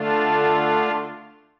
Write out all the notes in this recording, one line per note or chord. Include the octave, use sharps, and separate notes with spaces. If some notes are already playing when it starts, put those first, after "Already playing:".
Already playing: D3 A3 D4 F4